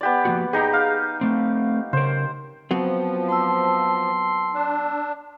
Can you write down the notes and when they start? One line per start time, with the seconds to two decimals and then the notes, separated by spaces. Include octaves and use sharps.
0.01 B3 G4 D5
0.25 F3 A#3 F#4
0.53 D#4 G4 G#4 A#5
0.73 F5
1.21 A3 C4
1.93 C#3 A#4 C5
2.71 F3 F#3 B3 C4
3.29 A5 C6 E6
4.54 D4